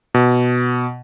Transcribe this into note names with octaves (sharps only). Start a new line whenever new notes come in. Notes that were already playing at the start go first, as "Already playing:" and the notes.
B2